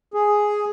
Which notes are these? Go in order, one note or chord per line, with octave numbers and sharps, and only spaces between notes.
G#4